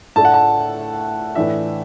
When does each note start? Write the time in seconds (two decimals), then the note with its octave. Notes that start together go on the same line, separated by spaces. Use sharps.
0.16 A2 A3 D4 A5
0.25 F#5
0.34 A5
1.35 A2 E3 D4 E5